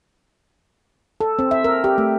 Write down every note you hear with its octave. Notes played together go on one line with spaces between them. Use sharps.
A4
C4
E5
A#4
G4
A3